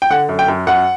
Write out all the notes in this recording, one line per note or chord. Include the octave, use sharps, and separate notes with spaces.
G5
D3 F#5
F#2
G5
F#2
F#2 F#5